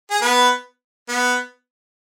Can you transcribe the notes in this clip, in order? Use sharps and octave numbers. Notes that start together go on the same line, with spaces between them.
G#4
B3 B4
B3